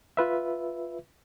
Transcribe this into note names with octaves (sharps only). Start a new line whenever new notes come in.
F4 B4 E5